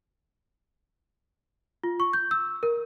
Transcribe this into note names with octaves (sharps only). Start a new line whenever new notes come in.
F4
C#6
G6
E6
A#4